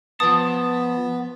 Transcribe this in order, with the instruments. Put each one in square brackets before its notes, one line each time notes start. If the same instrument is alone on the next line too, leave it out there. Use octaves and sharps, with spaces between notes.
[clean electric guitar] F3 A5 [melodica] B3 [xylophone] D#6